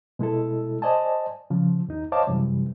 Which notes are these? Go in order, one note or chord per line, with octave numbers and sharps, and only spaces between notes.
B2 G#3 E4 A4
C5 D5 D#5 G#5 A5
C#3 F3
D#2 D#4
C5 C#5 D#5 F5 A5 D6
F#2 C3 E3 G3